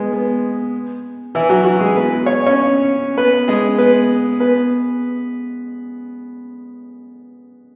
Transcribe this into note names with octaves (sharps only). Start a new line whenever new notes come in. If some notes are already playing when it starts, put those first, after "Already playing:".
Already playing: G#3 B3
B3
E3 E4
F#3 F#4
F#3 F#4
G#3 G#4
B3 B4
C#5
C#4 C#5
B3 B4
G#3 G#4
B3 B4
B3 B4